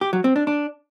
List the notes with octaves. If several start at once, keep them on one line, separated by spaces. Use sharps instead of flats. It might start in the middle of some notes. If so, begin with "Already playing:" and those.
G4
F#3
C4
D4
D4